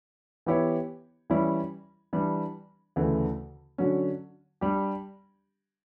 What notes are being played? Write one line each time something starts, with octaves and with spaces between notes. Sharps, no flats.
E3 B3 E4 G4 C#5
E3 G3 C#4 E4
E3 G3 D4
D2 C#3 E3 A3
D3 F#3 C#4
G3 D4 G4